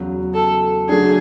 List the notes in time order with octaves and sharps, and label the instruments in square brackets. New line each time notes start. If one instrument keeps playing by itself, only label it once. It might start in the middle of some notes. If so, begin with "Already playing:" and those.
Already playing: [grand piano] E2 C#3 F#3
[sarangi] A4
[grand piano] D3 F#3 A3 D4 [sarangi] G#4